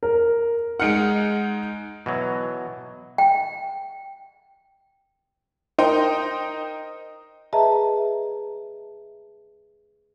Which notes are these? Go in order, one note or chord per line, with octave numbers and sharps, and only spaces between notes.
A#4
G#3 D#4 F#5 F6 C#7 D7
B2 E3 F#3
G5
D#4 A#4 C5 D#5 G5
G#4 B4 D#5 E5 A5 A#5